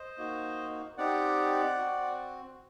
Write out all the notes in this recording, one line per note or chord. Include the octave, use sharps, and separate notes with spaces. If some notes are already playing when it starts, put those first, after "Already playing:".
Already playing: C5 D#5
A#3 D#4 F#4
C4 D#4 G4 D5 F#5
C4 F#4